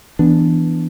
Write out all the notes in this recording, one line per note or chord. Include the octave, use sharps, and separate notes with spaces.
E3 B3 D4